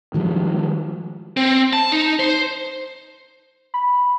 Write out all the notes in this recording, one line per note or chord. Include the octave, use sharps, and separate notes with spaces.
D#3 F3 G3 G#3
C4
A5
D#4
C5
B5